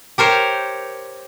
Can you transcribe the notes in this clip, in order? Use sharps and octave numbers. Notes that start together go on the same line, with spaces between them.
G4 A#4 C5 C#5